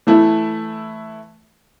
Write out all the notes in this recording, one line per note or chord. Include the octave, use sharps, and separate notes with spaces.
E3 A3 E4